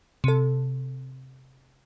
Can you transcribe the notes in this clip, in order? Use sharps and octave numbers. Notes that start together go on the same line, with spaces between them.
C3 A4